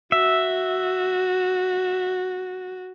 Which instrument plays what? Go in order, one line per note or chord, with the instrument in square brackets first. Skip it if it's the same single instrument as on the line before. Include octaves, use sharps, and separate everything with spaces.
[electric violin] F#4 [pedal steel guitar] E5